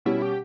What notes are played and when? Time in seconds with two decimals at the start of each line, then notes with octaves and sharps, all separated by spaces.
0.05 B2 G3 C#4 E4
0.22 G4